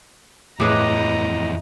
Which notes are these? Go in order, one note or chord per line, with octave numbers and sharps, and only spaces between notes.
F2 A2 E3 G4 G#4 B4 D#5 A#5